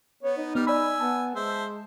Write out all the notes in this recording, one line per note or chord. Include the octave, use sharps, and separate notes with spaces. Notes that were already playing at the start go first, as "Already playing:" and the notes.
B3 C#5
D#4
G3 B3 F6
D5 G#5 B5 E6
B3 A5
G#3 C5 E5